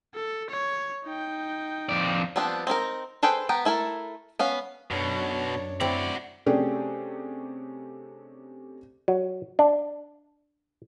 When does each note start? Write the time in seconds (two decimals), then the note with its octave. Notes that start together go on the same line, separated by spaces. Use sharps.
0.14 A4
0.50 C#5
1.05 D#4 G5
1.89 F2 D5
2.36 F3 G3 B3 C4 D4
2.67 C4 D#4 E4 A#4
3.23 G#4 A4 B4 C5 G5
3.49 B3 F#5 G5 A#5
3.65 A3 E4 A4 A#4
4.39 B3 C#4 F5
4.91 B1 F#2 B2 D4 C#5
5.81 C4 E4 F#4 D5
6.46 C3 A3 C#4 D4 G4 G#4
9.08 F#3
9.59 D4